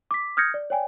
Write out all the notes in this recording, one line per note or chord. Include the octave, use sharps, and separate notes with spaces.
D6 B6
D#6 F6 G6 G#6 A#6 C#7
D5
C#5 D5 G5 G#5